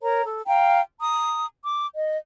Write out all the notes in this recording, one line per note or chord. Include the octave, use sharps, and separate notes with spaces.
A#4 C#5 A#5
A4
F5 G5 A#5
A#5 D#6
D6
D#5